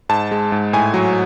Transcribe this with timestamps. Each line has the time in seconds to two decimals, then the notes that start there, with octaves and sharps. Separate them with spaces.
0.09 G#2 A5
0.31 G#3
0.52 G#2
0.73 A2 G#5
0.94 F#3